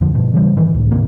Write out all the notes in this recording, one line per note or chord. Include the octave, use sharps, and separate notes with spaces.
D#1 F2 D3 F3
G2 B2 F3
C#3 E3 G3
G#2 D#3 E3
C#2 A2
D2 G#2 C3 A#3